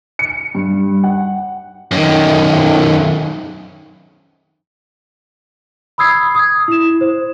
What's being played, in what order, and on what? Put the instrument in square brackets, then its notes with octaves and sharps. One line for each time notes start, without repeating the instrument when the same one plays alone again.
[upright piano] C#7
G2
F#5
[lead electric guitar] F#2 D#3
[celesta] B5 D#6 E6 G#6 C7
D#6 G#6
E4 E7
C5